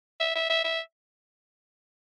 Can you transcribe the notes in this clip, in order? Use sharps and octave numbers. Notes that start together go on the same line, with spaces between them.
E5
E5
E5
E5